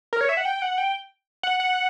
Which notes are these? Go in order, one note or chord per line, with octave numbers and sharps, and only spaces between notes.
A#4
C#5
E5
F#5
G5
F#5
G5
F#5
F#5